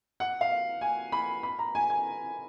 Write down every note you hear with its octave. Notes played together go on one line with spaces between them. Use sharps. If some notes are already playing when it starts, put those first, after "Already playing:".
F#5
F5
G#5
B5
B5
A#5
G#5
G#5